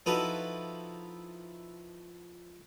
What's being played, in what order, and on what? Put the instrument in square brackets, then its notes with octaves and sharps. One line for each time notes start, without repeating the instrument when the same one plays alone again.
[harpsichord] F3 D#4 E4 F#4 A4 B4